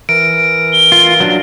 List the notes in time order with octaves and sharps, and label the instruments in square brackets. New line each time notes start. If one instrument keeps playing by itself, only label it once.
[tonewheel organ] E3 A#4 [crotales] D7
[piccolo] G7
[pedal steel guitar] F4
F#3 D4